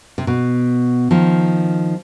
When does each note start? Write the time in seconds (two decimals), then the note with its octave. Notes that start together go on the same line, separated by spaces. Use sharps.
0.18 C3
0.27 B2
1.11 D#3 F3